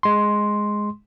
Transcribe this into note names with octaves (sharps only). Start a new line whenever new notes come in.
G#3 C6